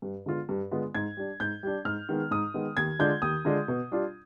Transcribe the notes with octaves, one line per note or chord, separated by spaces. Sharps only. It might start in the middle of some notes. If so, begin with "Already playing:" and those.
G2
D3 G#3 B3 F4
G2
D3 G#3 B3 F4
G#2 G#6
G3 D4
G#2 G6
G3 D4
G#2 F6
D#3 G#3 B3
G#2 D#6
D#3 G#3 B3
D#2 G#6
D3 G#3 D4 F4 G6
D#2 D#6
D3 G#3 D4 F4
B2
G3 D4 F4